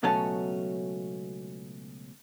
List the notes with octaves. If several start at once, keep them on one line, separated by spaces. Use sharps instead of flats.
C#2 B2 F#3 A3 C#4 A5